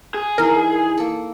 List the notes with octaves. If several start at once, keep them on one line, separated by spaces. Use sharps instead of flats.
G#4
E3 D#4 E4 A#4
A#3 A4